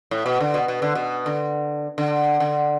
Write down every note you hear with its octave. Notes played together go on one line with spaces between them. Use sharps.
A2
B2
D3
B2
B2
D3
B2
D3
D3
D3